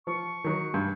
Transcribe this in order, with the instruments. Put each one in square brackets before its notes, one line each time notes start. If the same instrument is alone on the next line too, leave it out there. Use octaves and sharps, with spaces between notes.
[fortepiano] F3 [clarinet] C#6
[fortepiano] D#3 F#3
G2